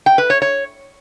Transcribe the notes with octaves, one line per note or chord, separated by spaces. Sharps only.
G5
B4
C#5
C#5